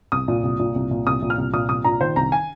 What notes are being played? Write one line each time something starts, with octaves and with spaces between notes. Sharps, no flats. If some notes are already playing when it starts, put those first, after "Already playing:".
C2 D#6
A#2
C2
A#2
C2
A#2
C2 D#6
A#2
F6
C2
A#2 D#6
C2 D#6
A#2 A#5
D#3 C5
C2 A#5
G#5